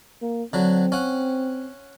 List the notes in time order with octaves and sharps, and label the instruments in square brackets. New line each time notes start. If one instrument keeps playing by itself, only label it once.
[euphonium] A#3
[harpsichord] D3 F#3 [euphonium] C4
[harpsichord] C#4 F#5